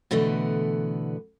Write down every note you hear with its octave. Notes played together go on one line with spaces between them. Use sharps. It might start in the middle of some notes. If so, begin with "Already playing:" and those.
B2 D3 E3 A3 B3